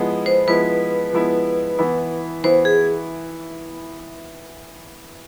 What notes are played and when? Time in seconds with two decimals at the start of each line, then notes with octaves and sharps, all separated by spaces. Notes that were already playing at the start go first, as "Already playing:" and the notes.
Already playing: F3 G#3 B3 E4
0.26 C5
0.47 F3 G#3 B3 E4 B4
1.13 F3 G#3 B3 E4
1.79 E3 B3 E4
2.44 E3 B3 E4 C5
2.65 G#4